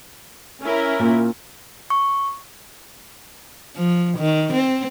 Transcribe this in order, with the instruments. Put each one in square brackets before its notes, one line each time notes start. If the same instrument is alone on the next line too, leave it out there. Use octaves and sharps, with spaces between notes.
[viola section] C#4 E4 A#4
[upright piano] A#2
[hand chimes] C#6
[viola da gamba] F3
D#3
C4